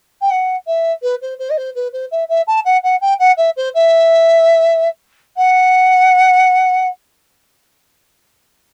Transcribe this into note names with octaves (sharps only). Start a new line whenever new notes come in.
G5
F#5
E5
B4
C5
C5
D#5
C5
B4
C5
E5
E5
A5
F#5
F#5
G5
F#5
E5
C5
E5
F#5